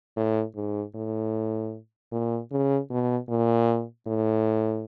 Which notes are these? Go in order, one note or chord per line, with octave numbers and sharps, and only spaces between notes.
A2
G#2
A2
A#2
C#3
B2
A#2
A2